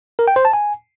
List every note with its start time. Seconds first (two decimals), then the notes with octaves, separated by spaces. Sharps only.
0.19 A#4
0.28 G5
0.36 C5
0.45 A5
0.53 G#5